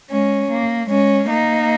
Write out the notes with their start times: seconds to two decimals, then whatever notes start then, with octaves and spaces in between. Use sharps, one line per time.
0.11 G#3 C#4
0.51 A#3
0.90 G#3 C#4
1.31 A#3 D#4